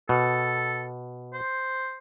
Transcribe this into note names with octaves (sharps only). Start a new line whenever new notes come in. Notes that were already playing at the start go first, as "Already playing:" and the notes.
B2 A4
C5